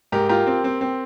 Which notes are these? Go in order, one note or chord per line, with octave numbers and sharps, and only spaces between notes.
G#2 G4 A#4
F4 G4 A#4
C4
C4
C4